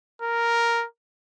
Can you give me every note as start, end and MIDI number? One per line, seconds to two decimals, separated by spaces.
0.22 0.85 70